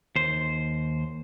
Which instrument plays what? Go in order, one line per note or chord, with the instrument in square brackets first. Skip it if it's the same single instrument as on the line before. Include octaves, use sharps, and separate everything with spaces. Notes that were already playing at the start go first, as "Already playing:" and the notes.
[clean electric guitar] D#2 C5